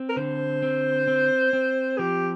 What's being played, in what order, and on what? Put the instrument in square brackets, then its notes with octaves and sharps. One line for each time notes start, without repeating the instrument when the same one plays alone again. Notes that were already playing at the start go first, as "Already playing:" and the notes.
Already playing: [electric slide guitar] C4
[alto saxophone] A#4
[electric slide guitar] D3 [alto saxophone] C5
[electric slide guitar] C4
C4
C4
[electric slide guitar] F3 [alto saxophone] G4